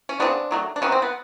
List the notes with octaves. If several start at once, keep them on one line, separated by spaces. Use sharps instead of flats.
C#4
F#3 B3 C4 D4
C#3
D#3 F#3 A3
D4
C3 D#3 F#3 B3 C#4
C4
B3